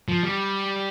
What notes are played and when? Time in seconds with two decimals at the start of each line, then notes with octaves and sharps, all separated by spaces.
0.09 F3
0.23 G3